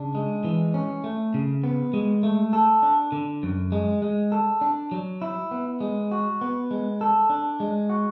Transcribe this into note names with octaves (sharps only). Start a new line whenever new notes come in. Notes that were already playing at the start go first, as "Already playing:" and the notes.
Already playing: C#3 D4
G#3
E3
C#4
A3
C#3
B3
G#3
A3
A4
D4
D3
F#2
G#3
G#3
A4
D4
F#3
E4
B3
G#3
F#4
B3
G#3
A4
D4
G#3
F#4